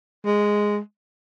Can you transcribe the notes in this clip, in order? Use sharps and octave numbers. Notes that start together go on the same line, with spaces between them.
G#3